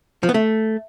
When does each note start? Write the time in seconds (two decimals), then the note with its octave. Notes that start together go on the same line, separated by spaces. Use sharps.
0.23 F3
0.29 B3
0.34 A3